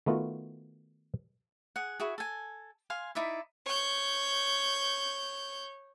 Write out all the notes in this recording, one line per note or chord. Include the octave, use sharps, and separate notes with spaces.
D#3 A3 B3 F4 F#4
G#4 F#5
E4 F#4 G#4
A4 G#5
F5 G#5 C6
D#4 E4 D5 E5
C#5 G6